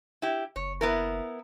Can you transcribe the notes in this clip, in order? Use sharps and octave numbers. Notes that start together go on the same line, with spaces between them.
E4 G4
F#1 C#5
B3 E4 A#4